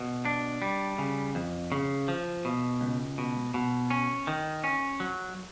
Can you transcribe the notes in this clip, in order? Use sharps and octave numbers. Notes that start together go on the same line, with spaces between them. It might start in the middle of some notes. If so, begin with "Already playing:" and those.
Already playing: B2
D4
G3
C#3
F2
C#3
F3
B2
C#2
B2
B2
C#4
D#3
C#4
F#3